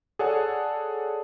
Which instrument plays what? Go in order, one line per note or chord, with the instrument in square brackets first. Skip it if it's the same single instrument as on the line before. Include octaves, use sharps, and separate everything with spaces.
[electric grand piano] G#4 A4 C#5 D5 F#5 A5